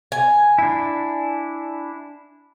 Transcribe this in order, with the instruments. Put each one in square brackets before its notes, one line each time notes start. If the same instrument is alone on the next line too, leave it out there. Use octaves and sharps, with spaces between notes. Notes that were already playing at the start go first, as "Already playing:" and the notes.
[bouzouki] G#5
[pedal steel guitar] D4 E4